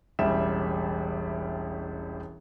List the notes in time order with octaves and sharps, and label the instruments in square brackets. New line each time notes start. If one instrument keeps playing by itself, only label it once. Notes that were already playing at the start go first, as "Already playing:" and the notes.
[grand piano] E1 A1 G3 E5 E7